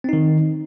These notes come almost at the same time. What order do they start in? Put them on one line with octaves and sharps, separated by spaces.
C4 D#4 D#3